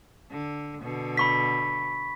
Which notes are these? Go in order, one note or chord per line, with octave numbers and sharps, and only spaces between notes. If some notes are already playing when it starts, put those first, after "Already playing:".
D3
B2 D3
B5 C#6 B6